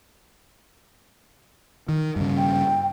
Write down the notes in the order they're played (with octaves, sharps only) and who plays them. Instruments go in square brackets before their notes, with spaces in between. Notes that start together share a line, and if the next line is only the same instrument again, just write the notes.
[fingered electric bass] D#3
G2 C#3
[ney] G5